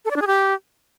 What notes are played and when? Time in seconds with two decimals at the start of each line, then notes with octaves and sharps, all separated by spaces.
0.05 A4
0.11 D5
0.16 D4
0.22 G#4
0.27 G4